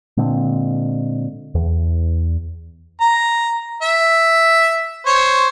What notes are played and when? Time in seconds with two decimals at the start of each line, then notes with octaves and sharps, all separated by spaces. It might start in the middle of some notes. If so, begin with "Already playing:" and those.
0.17 A#2 D3 G#3 C4
1.55 E2
3.01 A#5
3.82 E5
5.06 C5 C#5